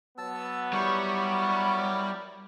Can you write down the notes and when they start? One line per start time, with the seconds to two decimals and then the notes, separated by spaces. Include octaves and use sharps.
0.18 F#3 B3 A5 E6
0.73 G3 E4 A#4 D5 C#6